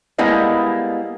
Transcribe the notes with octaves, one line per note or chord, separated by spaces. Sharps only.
G3 G#3 A#3 B3 E4 D#5